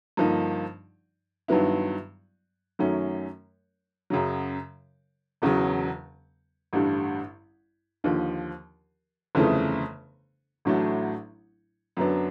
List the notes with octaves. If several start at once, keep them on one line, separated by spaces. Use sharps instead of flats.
G2 D3 F3 A#3 D#4
G2 D#3 F#3 B3 E4
F#2 D#3 F#3 A3 C#4
F#2 C#3 F#3
E1 E2 C#3 F#3
A1 G2 D3 G3
D#2 D3 F3
G1 F2 C#3 E3 A3
A1 A2 F#3 A3 D4
F#2 D3 F#3 B3 D4